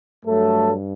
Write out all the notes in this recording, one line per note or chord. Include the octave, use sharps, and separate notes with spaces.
G2 F#3 A3 A4